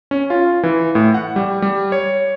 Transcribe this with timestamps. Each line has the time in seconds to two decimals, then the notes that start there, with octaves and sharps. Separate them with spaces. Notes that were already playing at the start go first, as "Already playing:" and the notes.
0.11 C#4
0.30 F4
0.63 E3
0.95 A2
1.14 F#5
1.36 G3
1.62 G3
1.92 C#5